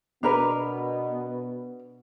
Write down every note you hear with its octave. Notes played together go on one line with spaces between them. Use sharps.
B2 B3 D4 A#4 B4